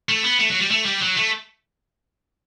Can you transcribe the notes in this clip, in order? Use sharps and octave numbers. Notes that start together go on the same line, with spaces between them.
A3
B3
A3
F#3
G3
A3
G3
F#3
A3